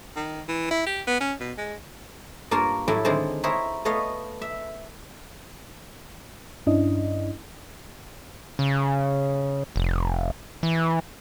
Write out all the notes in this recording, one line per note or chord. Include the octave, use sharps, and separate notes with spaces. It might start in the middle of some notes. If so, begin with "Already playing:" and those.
D#3
E3
E4
G4
B3
C#4
B2
G#3
G2 A#3 F4 A#4 C#5 A5
A2 F#3 G3 E4 A4 G5
D3 D#3 G#3 C4 C5 A5
E4 G#4 A#4 C5 C#5 E5
A3 B3 C#5 D#5 F5
E5
G2 C#4 D4 E4 D#5
C#3
F1
E3